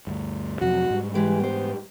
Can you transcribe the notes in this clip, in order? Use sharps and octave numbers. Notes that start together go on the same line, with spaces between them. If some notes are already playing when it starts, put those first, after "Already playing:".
D2 G2
F2 C3 F#3 F#4
G#2 G3
E3 G#3 G4 B4
B3 C5